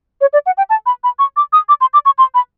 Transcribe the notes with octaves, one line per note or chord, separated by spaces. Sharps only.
C#5
D5
F#5
G5
A5
B5
B5
C#6
D6
D#6
D6
C6
D6
C#6
C6
B5